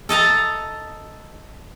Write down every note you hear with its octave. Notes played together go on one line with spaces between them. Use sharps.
A4 D#5 A5 A#5